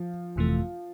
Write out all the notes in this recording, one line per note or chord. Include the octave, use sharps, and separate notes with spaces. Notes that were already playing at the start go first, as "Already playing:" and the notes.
Already playing: F3
G1 F2 C3 E3 A3